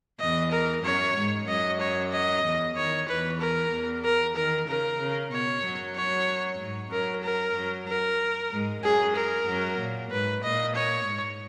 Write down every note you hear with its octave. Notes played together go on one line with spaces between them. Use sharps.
E2 E3 D#5
A#4
F#2 F#3 C#5
G#2 G#3
F#2 F#3 D#5
C#5
D#5
E2 E3
D#3 C#5
E2 E3 B4
A#4
E2 E3
A#4
D#3 A#4
C#3 A#4
C#3
B2 C#5
F#2 F#3
C#5
G#2 G#3
F#2 F#3 A#4
A#4
F#2 F#3
A#4
G#2 G#3
F#2 F#3 G#4
A#4
F#2 F#3
A#2
G#2 B4
A#2 D#5
C#5
G#2